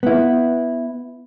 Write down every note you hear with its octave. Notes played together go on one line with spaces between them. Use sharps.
B3 E4